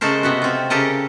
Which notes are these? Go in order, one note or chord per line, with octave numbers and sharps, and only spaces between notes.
C#3 G#3 A3 A4 A#4 C5
C3 B3 F#4
C4 F4
C#3 G4 A4 A#4 D#5